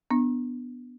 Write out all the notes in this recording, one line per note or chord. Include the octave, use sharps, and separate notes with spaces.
B3 D4